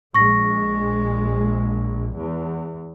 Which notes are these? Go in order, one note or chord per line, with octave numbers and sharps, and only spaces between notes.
A#1 G#3 C#6 A#6
E2